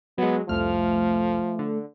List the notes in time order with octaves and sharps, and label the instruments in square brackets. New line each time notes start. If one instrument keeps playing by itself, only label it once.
[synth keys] F#3 G#3 [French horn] B3
[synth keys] C2 F2 F6 [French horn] F3 [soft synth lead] A3
[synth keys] D3